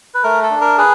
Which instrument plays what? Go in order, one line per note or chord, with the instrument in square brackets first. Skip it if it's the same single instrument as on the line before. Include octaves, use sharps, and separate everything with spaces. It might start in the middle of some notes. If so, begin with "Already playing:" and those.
[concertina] B4
A3 A#4
A4
D4
A#4
G#4 B4